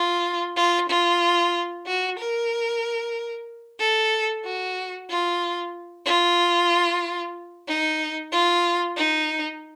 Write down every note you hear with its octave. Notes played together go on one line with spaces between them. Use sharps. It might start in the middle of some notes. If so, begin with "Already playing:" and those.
Already playing: F4
F4
F4
F#4
A#4
A4
F#4
F4
F4
D#4
F4
D#4